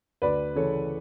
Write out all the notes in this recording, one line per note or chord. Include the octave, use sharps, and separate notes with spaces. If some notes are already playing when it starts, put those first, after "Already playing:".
D2 B4 D5
C#3 E3 A4 C#5